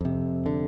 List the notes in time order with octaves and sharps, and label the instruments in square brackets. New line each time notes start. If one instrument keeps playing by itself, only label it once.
[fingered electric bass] F2 C3
D3